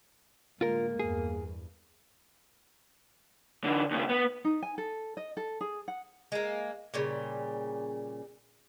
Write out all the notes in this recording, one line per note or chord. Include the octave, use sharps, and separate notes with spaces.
A2 D3 G#3 A#3 F4 A#4
E2 G2 G#4
D3 E3
D#2 C#3
B3
D#4
G#5
A4
D#5
A4
G#4
F#5
G#3 A#3
A#2 C#3 G3